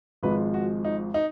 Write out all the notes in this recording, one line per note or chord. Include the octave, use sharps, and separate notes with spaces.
G#1 G#2 F3 G#3 B4
F#4
D#4
D#4